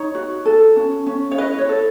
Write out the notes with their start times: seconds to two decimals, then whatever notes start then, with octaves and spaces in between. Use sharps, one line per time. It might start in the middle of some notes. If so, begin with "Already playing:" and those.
Already playing: D#4 C#5
0.15 F#4
0.45 A4
0.76 C#4
1.06 C#4
1.31 C#5
1.38 E4 B4 D#5
1.58 C#5
1.69 A4